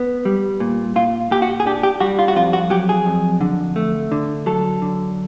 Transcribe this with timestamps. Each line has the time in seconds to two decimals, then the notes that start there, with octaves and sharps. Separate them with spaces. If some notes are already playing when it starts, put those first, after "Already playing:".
Already playing: B3
0.25 G3
0.60 A#2
0.96 A#2 F4
1.31 A#2 G4
1.42 F#4
1.60 G#4
1.66 D4 G4
1.83 G4
2.00 G3 F#4
2.19 F4
2.28 F#4
2.36 F2 F4
2.53 F#4
2.70 F#3 G4
2.89 G#4
3.06 F2
3.41 D3
3.76 A3
4.12 D3
4.46 F#3 A4
4.82 D3